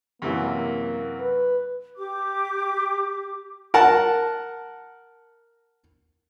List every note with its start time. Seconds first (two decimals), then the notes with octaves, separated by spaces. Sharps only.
0.22 F#2 C3 E3 A#3
1.20 B4
1.97 G4 D6
3.74 A#4 F#5 A5